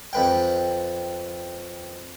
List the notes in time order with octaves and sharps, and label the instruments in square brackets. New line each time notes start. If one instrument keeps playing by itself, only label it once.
[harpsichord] F2 B4 G5